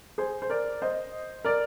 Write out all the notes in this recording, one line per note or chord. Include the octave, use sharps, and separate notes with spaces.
G#4 C5
C5
A#4 D5
C5 D#5
A#4 D5